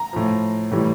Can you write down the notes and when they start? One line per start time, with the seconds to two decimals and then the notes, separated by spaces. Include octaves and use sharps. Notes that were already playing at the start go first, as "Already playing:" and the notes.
Already playing: A#5
0.13 A2 F3
0.71 A2 E3 G3